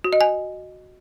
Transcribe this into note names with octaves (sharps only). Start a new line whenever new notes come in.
F#4
D#5
G#5